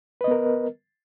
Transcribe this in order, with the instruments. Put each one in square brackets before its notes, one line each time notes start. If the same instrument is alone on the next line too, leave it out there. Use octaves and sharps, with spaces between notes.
[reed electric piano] B4
D#5
B3
A#4